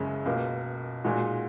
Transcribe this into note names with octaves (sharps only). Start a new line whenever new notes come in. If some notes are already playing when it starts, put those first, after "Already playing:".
Already playing: F#1 F#2 C#3 G#3 C#4
C#2 B2 A#3
A#2 G#3 D#4 F#4